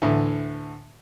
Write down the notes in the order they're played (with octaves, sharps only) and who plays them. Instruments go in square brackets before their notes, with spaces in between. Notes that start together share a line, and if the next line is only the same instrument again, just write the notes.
[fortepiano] D2 A2 D3 E3